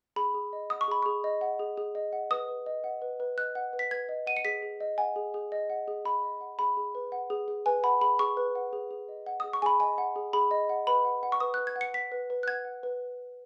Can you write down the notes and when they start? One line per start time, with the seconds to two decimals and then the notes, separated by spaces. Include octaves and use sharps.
0.16 G#4 B5
0.34 G#4
0.53 D#5
0.70 F#5 D#6
0.81 C#6
0.88 G#4 B5
1.02 G#4 C#6
1.24 D#5
1.41 F#5
1.59 G#4
1.77 G#4
1.95 D#5
2.13 F#5
2.31 B4 D#6
2.48 B4
2.66 D#5
2.84 F#5
3.02 B4
3.20 B4
3.38 D#5 F#6
3.55 F#5
3.73 B4
3.79 B6
3.91 B4 G#6
4.09 D#5
4.27 F#5 D#7
4.37 C#7
4.45 G#4 B6
4.62 G#4
4.80 D#5
4.98 F#5 G#5
5.16 G#4
5.34 G#4
5.52 D#5
5.70 F#5
5.88 G#4
6.05 G#4 B5
6.23 D#5
6.41 F#5
6.59 G#4 B5
6.77 G#4
6.95 B4
7.12 F#5
7.30 G#4
7.48 G#4
7.66 B4 G#5
7.83 F#5 B5
8.01 G#4 B5
8.19 G#4 C#6
8.37 B4
8.55 F#5
8.73 G#4
8.91 G#4
9.09 D#5
9.26 F#5
9.40 G#4 D#6
9.53 C#6
9.62 G#4 G#5 B5
9.80 D#5 G#5
9.98 F#5
10.16 G#4
10.33 G#4 B5
10.51 D#5
10.69 F#5
10.87 B4 B5
11.05 F#5
11.23 F#5
11.32 C#6
11.40 B4 D#6
11.54 B4 F#6
11.67 G#6
11.76 F#5
11.81 C#7
11.94 F#5 B6
12.12 B4
12.30 B4
12.43 F#6
12.47 F#5 G#6
12.65 F#5
12.83 B4